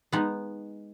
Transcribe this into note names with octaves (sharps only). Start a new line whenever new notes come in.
G#3 B3 D#4